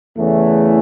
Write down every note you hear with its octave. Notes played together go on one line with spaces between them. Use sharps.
E2 C#3 E3 A3